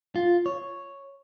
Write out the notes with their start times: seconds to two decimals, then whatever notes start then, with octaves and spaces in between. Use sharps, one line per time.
0.16 F4
0.46 C#5